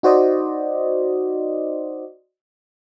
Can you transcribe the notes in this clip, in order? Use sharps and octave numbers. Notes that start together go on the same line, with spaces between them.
D#4 F#4 C5 D5 D#5